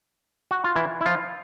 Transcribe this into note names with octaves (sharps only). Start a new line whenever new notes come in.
F#4
F4
E3 E4
E4
F3 F4